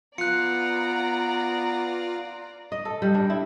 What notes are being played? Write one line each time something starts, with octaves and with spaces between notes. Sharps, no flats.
B3 F4 D5 A#5 F#6 C#7
D#5
A4
G3
D4
E4